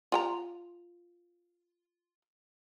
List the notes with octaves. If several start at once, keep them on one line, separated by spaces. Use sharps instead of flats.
F4 G5 A#5